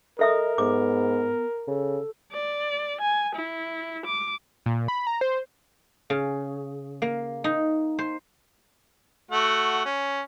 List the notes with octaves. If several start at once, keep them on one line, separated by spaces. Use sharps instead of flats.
A4 A#4 D#5 E5 D#6
G#2 B3 D6
C#3 A4
D5
G#5
E4
D6
A#2
B5
A#5
C5
C#3
A#3
D#4
C5
A3 F#4 F#5
C#4